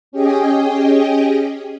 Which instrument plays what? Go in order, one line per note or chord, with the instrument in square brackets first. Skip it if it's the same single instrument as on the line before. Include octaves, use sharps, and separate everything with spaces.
[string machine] C#4 G4 G#4 D#5 G5